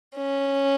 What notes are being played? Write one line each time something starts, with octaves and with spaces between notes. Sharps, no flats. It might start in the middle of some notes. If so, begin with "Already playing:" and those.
C#4